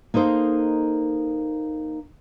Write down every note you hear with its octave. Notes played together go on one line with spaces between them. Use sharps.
A#3 D#4 A4 C5 D#5